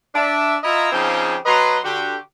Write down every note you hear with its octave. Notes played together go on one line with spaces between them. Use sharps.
D4 E5
E4 F4 D#5 E5 A#5
C#3 F3 C4 D#4 G4 G#4
F#3 B4 D#5 A#5 C6
D3 F#4 G4